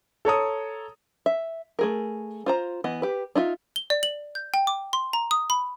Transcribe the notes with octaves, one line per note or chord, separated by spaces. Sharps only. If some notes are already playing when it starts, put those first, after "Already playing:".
A4 C#5 A#5 D#6
E5
A3 G#4 A#4
F4 C5 A#5
E3 B3 D#5
G4 B4
D4 D#4 F4 E5
G7
D5
F#7
G6
G5
D6
C6
A#5
D#6
B5